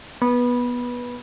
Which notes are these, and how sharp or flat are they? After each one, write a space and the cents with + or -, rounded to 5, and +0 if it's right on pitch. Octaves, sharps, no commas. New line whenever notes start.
B3 -15